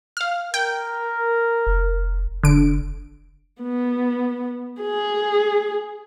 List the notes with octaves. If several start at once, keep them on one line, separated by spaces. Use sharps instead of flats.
F5 F6
A#4 G5
F1
F1 D3 D7
B3
G#4